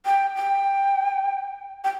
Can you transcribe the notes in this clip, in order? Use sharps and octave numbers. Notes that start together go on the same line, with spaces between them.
G5
G5
G5